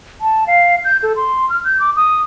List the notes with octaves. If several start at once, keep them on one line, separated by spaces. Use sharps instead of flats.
A5
F5
G6
A4
C6
F6
G6
D6
D#6